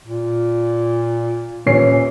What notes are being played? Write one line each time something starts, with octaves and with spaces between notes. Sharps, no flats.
A#2
D#1 E3 C#4 C7